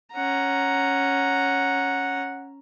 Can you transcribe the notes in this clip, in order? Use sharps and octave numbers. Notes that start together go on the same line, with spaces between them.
C#4 F#5 A#5